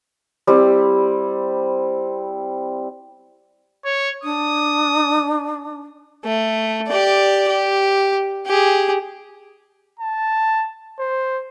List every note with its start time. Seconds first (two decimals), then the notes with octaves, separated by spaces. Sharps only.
0.47 G3 C4 E4
3.85 C#5
4.24 D4 D#6
6.24 A3
6.88 G4 D5
7.48 G4
8.46 G4 G#4
10.00 A5
11.00 C5